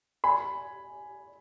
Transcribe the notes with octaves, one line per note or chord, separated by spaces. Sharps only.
G#5 B5